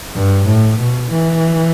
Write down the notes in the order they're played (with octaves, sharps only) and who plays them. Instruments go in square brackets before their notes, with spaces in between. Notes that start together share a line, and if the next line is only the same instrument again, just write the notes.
[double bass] G2
A2
B2
E3